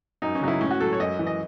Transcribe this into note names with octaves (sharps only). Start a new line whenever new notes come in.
F#2 D#4
C#4
C#3 F#3 D#4
E4
A2 C#4
F#4
F#3 A4
C#5
F#2 D#5
E3
D#5